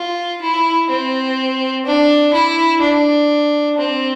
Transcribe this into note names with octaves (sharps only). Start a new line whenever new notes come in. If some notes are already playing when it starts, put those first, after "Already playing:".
Already playing: F4
E4
C4
D4
E4
D4
C4